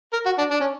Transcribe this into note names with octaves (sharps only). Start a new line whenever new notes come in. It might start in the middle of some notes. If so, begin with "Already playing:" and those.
A#4
F#4
D4
D4
C#4